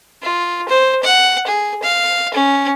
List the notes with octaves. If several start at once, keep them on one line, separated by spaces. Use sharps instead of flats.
F4
C5
F#5
G#4
F5
C#4